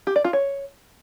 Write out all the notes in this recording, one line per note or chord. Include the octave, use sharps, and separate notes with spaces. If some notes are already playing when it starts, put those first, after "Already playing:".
G4
D5
F4
C#5